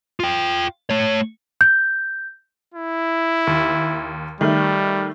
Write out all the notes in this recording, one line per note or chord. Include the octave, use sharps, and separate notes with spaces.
F4 G5
A3 C#5
G6
E4
D#2
D#3 G3 A3